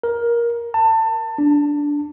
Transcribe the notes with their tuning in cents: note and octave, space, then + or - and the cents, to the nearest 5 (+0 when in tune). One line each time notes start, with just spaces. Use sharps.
A#4 +15
A5 +25
D4 -10